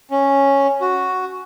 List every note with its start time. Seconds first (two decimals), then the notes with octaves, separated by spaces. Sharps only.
0.11 C#4
0.81 F#4